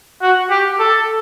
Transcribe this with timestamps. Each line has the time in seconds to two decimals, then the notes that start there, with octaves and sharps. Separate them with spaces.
0.22 F#4
0.50 G4
0.79 A4